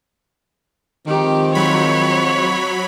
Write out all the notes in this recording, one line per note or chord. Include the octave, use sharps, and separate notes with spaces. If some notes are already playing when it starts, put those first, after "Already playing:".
D#3 F3 G#3 C4 G4
F#3 C#5 B5